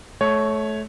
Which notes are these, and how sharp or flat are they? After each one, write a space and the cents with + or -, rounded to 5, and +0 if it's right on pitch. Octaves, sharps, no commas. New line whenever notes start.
A3 -25 C#5 +0